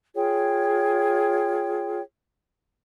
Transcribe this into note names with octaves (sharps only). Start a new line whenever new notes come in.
F4 G#4 C#5 G5